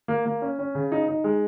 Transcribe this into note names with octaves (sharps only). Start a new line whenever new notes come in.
A#3
A#3
C#4
C#4
C#3
D#4
D#4
G#3